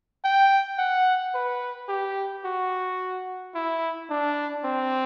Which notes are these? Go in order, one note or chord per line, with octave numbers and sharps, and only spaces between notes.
G5
F#5
B4
G4
F#4
E4
D4
C4